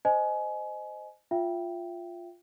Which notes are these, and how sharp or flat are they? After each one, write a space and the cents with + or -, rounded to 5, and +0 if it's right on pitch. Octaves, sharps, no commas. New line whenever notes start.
C5 -10 D#5 -10 G#5 +25
F4 +0 E5 +30 G5 -10